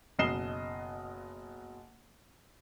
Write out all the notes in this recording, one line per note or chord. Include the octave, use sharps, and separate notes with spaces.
F#1 B2 D#5 C7 E7 G7